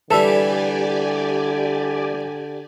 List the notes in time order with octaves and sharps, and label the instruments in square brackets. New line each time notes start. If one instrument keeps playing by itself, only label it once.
[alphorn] D3 [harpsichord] E3 G3 [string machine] G4 D5 G#5 [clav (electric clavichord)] A4